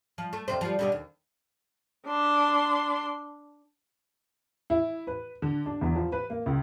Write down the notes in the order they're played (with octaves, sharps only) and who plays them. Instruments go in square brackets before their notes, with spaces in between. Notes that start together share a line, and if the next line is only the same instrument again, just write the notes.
[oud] F3
A3
F2 C3 C5
F3 G3
B2 D3 G3
D#2
[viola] D4 C6
[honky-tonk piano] E4
B4
D3
D4
E2
F3
B4
A#3
C#2